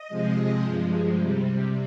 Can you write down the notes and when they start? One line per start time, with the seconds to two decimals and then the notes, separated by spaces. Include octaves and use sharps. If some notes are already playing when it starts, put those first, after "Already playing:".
Already playing: D#5
0.08 C3 F3 G#3
0.62 G2 F3 G#3
1.14 C3 G3